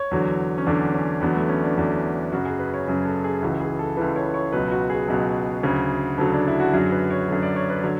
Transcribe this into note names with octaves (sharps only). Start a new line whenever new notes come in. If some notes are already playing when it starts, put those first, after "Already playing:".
Already playing: C#5
E2 D3 F#3
C#4
E2 D3 F#3 D4
C#4
E2 D3 F#3 B3
A3
C#4
D4
E2 D3 F#3
F#2 C#3 F#3 F#4
G#4
B4
C#5
F#2 C#3 F#3
A4
G#4
C#2 C#3 E3 F#4
G#4
A4
C#2 C#3 E3 B4
C#5
C#5
C#2 B2 F#3 B4
F#4
G#4
C#2 B2 F#3
D2 C#3 F#3
D2 C#3 F#3 A4
D4
E4
F#4
F#2 D3 F#3 G#4
B4
C#5
F#2 D3 F#3
D5
C#5
B4
D3 F#3 C#5